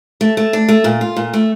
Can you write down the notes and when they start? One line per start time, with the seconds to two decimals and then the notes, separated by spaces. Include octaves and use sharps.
0.21 A3
0.37 A3
0.53 D4
0.69 A3
0.84 A#2
1.01 F4
1.17 A#2
1.33 A3